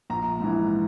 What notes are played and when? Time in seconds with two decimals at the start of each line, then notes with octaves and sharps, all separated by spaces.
0.10 A#1 A#5
0.40 G#2 E3